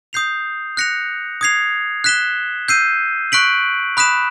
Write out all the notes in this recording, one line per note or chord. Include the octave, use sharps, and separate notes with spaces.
D#6 G6 C7 F7
F#6 A#6 C#7 F7
D#6 G#6 C7 F7
F#6 B6 E7 G7
E6 G6 C7 D#7
C#6 F#6 B6 D7 F#7
B5 D#6 F#6 B6 E7